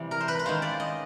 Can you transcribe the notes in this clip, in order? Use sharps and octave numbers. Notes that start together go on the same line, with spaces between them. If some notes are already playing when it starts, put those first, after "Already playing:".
Already playing: C3 E3 G3
A#4
C5
B4
B4
D#3 G#3 C#4 F4 C5
D5
D#5